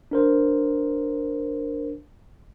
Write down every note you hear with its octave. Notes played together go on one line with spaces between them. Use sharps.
D4 A#4 C5